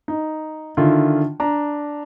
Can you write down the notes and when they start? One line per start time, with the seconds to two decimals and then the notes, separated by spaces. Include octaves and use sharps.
0.08 D#4
0.77 D3 D#3 E4 F4
1.40 D4 A#5